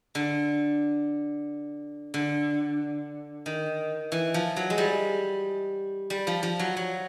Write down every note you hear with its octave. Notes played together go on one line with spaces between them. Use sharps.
D3
D3
D#3
E3
F3
F#3
G#3
G3
G3
F3
F3
F#3
F#3